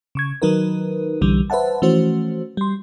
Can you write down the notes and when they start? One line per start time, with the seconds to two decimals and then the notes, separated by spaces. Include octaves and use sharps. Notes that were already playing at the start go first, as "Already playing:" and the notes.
0.15 C#3 C#6 G#6
0.42 D#3 F#3 D#4 A#4 B4
1.21 B1 D3 E3 G3
1.50 B4 C5 E5 F#5 A5
1.82 E3 F3 A3 C#4 F#4 C5
2.57 G3 C6